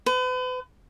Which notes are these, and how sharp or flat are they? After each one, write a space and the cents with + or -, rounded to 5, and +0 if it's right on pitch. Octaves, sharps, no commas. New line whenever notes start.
B4 +40